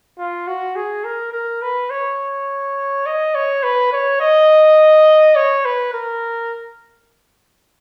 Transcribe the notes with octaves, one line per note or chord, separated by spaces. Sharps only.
F4
F#4
G#4
A#4
A#4
B4
C#5
D#5
C#5
B4
C#5
D#5
C#5
B4
A#4